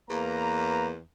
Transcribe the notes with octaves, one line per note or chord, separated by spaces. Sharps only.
E2 A#3 B4 A#5